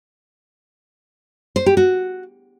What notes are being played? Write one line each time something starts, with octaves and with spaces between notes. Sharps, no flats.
C5
G4
F#4